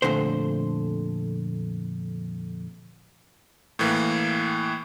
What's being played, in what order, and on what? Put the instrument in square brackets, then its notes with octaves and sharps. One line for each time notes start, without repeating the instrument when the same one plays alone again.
[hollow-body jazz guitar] F2 A#2 D3 A3 C5
[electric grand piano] A2 E3 A#3